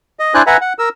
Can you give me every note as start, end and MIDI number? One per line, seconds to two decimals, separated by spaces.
0.19 0.34 75
0.34 0.42 62
0.34 0.42 64
0.34 0.42 72
0.34 0.42 74
0.34 0.42 80
0.34 0.42 90
0.47 0.57 71
0.47 0.57 76
0.47 0.57 78
0.47 0.57 80
0.47 0.57 82
0.61 0.73 78
0.79 0.89 70
0.79 0.89 88